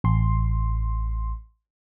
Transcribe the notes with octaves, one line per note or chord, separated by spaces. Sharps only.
A1 C6